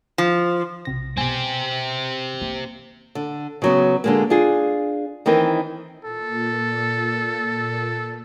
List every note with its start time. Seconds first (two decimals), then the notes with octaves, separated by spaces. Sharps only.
0.18 F3
0.85 B1 C3 A#6
1.17 B2 C4 G4 G#5
2.41 A#3
3.15 D3
3.62 C#3 F#3 B3
4.04 D3 G#3 A#3
4.30 D4 F4 G#4
5.26 D#3 E3 C4 D#4 A#4
6.04 A#2 A4